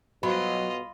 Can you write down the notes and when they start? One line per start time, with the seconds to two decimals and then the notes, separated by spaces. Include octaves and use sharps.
0.23 B2 F#3 F4 D#5 B5